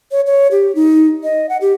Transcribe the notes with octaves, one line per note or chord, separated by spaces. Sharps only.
C#5
C#5
G4
D#4
D#5
F#5
G4